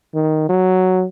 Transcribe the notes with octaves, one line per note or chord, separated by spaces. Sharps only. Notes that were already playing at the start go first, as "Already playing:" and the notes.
D#3
F#3